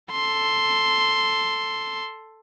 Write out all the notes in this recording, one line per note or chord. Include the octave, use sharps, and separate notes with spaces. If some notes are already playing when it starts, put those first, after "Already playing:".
A4 C6